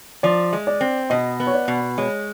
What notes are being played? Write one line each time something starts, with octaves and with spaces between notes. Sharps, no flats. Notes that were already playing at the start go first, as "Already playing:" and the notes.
F3 D5
G#3
D5
C4
B2 D#5
B3
C#5
D5
B2
G#3 C#5